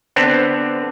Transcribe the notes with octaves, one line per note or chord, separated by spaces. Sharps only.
D3 B3 C4 D4